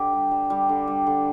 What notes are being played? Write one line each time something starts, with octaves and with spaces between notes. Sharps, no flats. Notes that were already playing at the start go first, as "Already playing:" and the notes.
Already playing: D3 G4
G3
G3
G3
D3
G3
D3